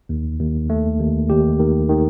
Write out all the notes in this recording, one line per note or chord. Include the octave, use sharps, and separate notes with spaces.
D#2
D#2
A3
D#2
D#2 G4
D#3
D#3